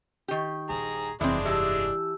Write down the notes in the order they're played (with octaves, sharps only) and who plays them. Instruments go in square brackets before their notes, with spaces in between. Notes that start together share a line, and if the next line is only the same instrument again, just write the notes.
[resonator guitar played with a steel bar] D#3 G4
[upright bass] D#1 A#1 [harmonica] G#4 A#5
[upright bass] F1 G2 [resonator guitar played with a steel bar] E3 C4 [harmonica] G#3 D4
[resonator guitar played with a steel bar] E3 A5 [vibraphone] G4 E6